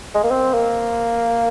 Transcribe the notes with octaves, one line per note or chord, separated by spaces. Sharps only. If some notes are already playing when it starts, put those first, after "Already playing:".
G#3
A#3
C4
A#3